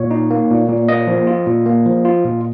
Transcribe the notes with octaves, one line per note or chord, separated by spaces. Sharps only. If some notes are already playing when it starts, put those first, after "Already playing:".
Already playing: A#2 C#5
D#4
A#3
A#2
A#2
A#3 D#5
F3
F4
A#2
A#3
F3
F4
A#2